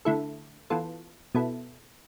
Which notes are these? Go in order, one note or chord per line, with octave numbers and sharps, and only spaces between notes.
D3 A3 E4 A4
E3 B3 F4 A4
B2 B3 E4 A4